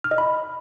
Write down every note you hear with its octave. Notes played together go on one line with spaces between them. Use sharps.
F6
D#5
B5